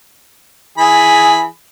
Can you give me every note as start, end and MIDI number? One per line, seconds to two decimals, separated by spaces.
0.78 1.45 52
0.78 1.45 68
0.78 1.45 83